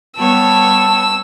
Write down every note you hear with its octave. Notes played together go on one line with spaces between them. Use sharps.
G3 B3 C#5 A5 E6